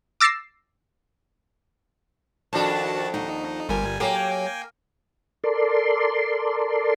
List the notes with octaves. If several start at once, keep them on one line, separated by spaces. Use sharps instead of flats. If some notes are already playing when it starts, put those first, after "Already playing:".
D6 E6 A6 A#6 C7 E7
F2 D#3 D4 F#4 A5
D#2 D#4 F#4
G1 G3 F4 A#4 G#5
F#3 A#3 G4 A4 G5 G#5
A4 A#4 D5 C6